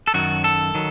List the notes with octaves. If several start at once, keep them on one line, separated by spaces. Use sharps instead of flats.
A4
F#2 D#3 F#3 F#4
A4
D#3 F#3